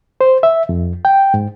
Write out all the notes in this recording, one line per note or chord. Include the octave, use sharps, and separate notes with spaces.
C5
E5
F2
G5
G#2